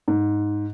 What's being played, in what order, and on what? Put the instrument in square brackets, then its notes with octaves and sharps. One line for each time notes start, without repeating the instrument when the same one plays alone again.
[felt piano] G#2